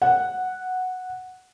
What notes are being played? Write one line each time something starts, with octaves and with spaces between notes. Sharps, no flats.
F#5